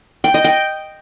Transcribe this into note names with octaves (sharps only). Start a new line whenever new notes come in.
G5
D#5
G5